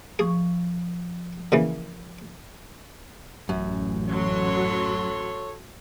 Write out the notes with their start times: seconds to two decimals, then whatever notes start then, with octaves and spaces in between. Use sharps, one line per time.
0.19 F3 G#4 C#6
1.52 A#2 C#3 E3
3.49 A1 F#2
4.09 F#3 F#4 A4 C#5 C6